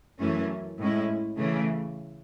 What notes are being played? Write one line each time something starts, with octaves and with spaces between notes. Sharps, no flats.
F#2 E3 A3 C#4
A2 G#3 C#4 E4
C#3 E3 A3